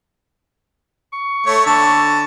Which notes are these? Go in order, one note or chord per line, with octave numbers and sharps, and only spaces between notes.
C#6
A3 C#5
D3 A5